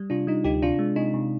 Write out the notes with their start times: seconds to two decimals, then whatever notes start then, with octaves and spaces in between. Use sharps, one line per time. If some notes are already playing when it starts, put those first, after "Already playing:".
Already playing: G3
0.10 C3 D4 F4
0.27 G3 D#4
0.44 D2 D#4 G4
0.62 C3 D4 F4
0.79 G#3
0.96 C3 D#4
1.14 C3